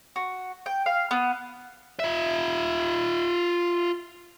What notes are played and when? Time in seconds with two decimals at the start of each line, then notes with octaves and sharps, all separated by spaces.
0.16 F#4
0.66 G5
0.86 F5
1.11 B3
2.00 F4 E5